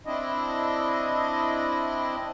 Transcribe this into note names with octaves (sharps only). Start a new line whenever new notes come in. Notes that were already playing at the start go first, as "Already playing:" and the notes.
C4 D4 E4 D#5